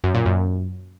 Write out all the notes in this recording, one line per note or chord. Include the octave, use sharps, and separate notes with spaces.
F#2
A#2
F#2